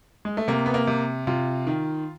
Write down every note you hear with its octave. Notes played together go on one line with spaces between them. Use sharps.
G#3
A3
C3 A#3
B3
A#3
C3
C3 F4
D#3